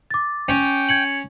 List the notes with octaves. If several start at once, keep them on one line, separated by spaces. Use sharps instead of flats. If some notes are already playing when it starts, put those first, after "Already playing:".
D6 A6
C#4 G5
G#6 C#7 F#7